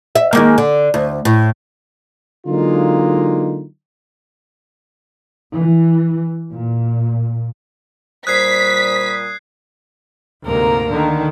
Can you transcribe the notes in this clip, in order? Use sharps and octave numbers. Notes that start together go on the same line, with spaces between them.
E5
D#3 G#3 A#3
D3
D2
A2
D3 F#3 G#3 A#3 D#4 F4
E3
A#2
A#2 G3 C5 D#6 F#6 G#6 B6 C7
D2 G#2 C3 A#3 A#4
D3 D#3